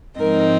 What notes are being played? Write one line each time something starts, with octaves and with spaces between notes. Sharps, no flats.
G#2 F3 G#3 C4 D#4 A#4